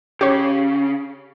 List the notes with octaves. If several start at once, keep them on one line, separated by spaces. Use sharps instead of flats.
C#3 G4 C#5